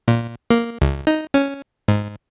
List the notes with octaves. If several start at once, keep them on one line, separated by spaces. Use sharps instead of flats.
A#2
A#3
C#2
D#4
C#4
G#2